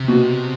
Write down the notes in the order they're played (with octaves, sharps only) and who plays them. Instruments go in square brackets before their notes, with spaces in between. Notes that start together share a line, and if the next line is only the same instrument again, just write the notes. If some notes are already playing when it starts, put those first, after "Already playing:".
Already playing: [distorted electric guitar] C3
[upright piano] B2